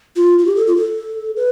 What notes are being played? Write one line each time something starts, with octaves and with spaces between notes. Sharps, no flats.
F4
F4
G4
A4
F4
A4
B4